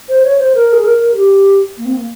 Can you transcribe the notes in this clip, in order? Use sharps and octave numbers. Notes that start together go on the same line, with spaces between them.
C5
C#5
C5
A#4
G#4
A#4
G#4
G4
A#3
C4
A#3